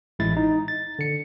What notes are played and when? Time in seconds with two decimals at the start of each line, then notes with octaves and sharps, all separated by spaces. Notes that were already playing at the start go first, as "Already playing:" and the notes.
0.19 A1 G#3 E4 A6
0.37 D#4
0.68 A6
0.99 D3 C#7